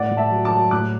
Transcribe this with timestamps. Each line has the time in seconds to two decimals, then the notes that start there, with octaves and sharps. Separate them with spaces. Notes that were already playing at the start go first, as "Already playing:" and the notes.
Already playing: A2 D5 F#5
0.11 A2
0.17 E5 A5
0.30 F#3
0.45 A5 D6
0.51 F#3
0.71 A2 D6 F#6